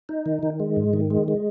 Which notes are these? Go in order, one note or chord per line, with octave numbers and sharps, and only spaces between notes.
D#4
D#3
D#3
G#3
G#2
D#3
G#3
G#3